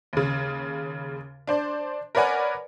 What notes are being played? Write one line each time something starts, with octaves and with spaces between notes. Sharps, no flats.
D#2 C#3
D4 C5 D5
A#4 B4 C#5 D5 F#5 G#5